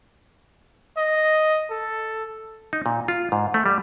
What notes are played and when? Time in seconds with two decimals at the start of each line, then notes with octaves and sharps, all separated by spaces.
0.98 D#5
1.71 A4
2.73 D#4
2.86 A#2
3.08 F4
3.32 G#2
3.54 A3
3.66 G3